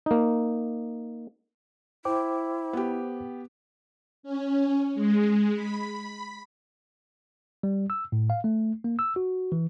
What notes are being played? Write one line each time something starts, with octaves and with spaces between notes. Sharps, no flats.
A#3 D#4
E4 C5 G5 D6
B3 G4
C#4
G#3
B5
G3
E6
A2
F5
A3
A#3
E6
F#4
E3